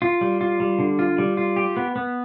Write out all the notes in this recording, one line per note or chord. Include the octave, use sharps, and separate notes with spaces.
F4
G3
F4
G3
D3
F4
G3
F4
G4
B3
B3